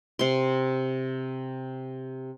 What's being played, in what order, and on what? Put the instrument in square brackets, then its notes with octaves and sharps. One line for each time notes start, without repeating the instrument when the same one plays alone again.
[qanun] C3 C6